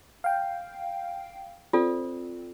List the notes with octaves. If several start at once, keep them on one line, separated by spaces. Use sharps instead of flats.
F5 G5
C4 F4 A4 D5